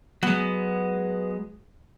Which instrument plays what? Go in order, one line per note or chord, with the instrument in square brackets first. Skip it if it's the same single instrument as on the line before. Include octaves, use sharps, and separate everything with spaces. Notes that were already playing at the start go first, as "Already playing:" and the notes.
[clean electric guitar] F#3 G#3 [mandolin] B3